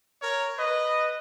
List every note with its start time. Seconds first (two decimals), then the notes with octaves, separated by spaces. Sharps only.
0.21 A#4 C#5
0.58 B4 D#5